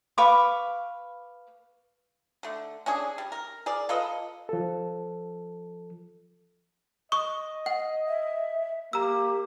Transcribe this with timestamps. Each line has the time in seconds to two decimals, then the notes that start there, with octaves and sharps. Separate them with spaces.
0.18 B4 F5 C#6 D6
2.43 D3 A3
2.86 C#4 D4 G#4
3.18 G3
3.32 A#4
3.66 G#4 A#4 D5
3.89 F4 A4 B4 D#5
4.49 F3 A4
7.12 D#5 C#6 D#6
7.66 F#5
8.07 E5
8.93 A#3 G4 A#5 E6